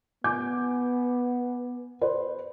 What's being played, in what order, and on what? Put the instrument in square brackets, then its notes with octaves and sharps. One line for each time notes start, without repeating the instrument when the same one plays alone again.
[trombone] B3 [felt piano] G#5 D6 G6
[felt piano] B4 C5